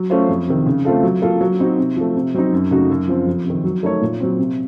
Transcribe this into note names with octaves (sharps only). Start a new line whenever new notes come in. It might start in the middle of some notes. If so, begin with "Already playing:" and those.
Already playing: F#3
A3 C#4 F4 C5
F2
C3 D#3
C#3
A3 C4 F4 A4
F#3
A#3 F4 A4
F#3
C4 D#4 F#4
C3
F3 A3
C3
F#3 C4 D#4
F#2
C#3 A3 D#4 F#4
F#2
F3 C4
F2
C3 D#3
F#3
A3 D#4 A#4 C#5
A#2
F#3 C4
C3